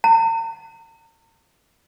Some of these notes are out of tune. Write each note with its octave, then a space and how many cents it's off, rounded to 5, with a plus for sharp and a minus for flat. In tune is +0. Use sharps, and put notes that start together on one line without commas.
A#5 -45